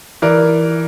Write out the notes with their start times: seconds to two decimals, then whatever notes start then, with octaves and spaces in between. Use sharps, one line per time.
0.22 E3 A#4 D5